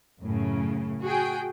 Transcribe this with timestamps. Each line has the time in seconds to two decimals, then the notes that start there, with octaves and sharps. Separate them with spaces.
0.21 F#2 A2 C#3
1.03 F#4 G#4 G5